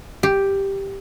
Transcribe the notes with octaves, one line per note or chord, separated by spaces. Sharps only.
G4